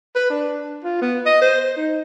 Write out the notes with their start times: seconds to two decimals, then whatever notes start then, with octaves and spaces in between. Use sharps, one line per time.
0.16 B4
0.30 D4
0.84 F4
1.01 B3
1.26 D#5
1.42 C5
1.77 D#4